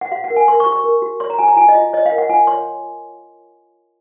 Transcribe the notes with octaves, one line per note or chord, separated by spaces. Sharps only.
F#5
F#4 F5
F#5
A#4
G#5
A#4 C6
C#6
F#4
C#6
A#4
F#4
C#5 C6
A#5
F#4 G#5
A#5
F4 G#5
D#5
F4
C#5 D#5
F5
A#4
F#5
F4 G#5
C#5 C6